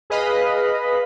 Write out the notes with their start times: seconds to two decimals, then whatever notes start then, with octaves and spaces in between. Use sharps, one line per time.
0.10 G#4 B4 D#5 F5 B5